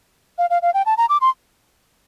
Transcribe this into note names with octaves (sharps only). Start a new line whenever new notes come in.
F5
F5
F5
G5
A5
A#5
D6
C6